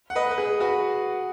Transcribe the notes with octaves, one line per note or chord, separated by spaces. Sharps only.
F#5
B4 D#5
B4
G#4
F#4 B4